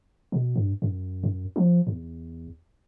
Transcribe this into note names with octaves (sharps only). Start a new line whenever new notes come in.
B2
G2
F#2
F#2
F3
E2